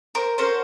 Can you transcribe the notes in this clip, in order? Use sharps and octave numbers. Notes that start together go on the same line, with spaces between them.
A#4 C5
C#4 F#4 A4 A#4 C5